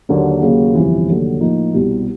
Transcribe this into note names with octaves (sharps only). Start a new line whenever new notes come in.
D#2 D3 F#3 A#3 D4
D#2 C#3 F#3 A#3
G1 F2 C3 E3
F1 D#2 D3 F#3 A3
A2 F3 A#3 D#4
C2 B2 G3